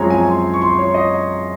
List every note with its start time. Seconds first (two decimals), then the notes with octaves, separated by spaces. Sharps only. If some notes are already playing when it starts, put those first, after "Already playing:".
Already playing: F#2 F3 G#3 C4 C#5 G#5 A#5
0.10 G#5
0.28 C6
0.54 C#6
0.62 C6
0.79 C#5
0.94 D#5